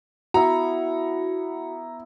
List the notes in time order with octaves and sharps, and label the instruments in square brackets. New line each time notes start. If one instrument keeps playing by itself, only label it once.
[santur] B3 E4 [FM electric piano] F#4 [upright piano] A#5